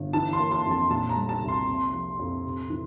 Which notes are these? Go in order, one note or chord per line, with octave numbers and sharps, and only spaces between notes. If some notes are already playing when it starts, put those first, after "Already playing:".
Already playing: G1
E3 A5
C6
A#3
C6
F2
A5
A#2 A5
A#5
G3
A5
C2
C6
C3
F3
F2
C3
E3